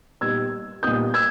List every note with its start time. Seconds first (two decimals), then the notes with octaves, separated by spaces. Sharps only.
0.21 A#2 G3 B3 D#4 E6 G#6
0.83 A#2 G3 B3 D#4 D#6 G6
1.14 E6 G#6